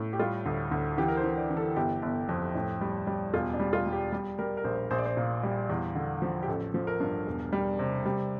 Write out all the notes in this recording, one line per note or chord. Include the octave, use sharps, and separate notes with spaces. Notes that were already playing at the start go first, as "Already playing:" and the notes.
Already playing: A2
G4
G3 F4
D2
D2
E3 G4
A#4
C5
E3
D5
E3
A4
G1 G4
G1
F2
A2
G3
G3
E1 F4
D4
G3
F4
G3
G4
G3
G3 A#4
A#4
A#1 C5
A#1 C5
D5
C5
A#2
G3
E2
D3
F3
G4
A1 A4
F3
A#4
G2
E1
G3
C3
G3